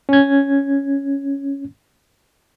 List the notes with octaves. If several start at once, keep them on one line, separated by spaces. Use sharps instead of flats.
C#4 G#6